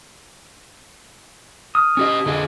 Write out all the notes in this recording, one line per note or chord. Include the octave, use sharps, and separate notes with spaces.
D#6 F6
C#4 G4 D#5
D3 G#4 D#5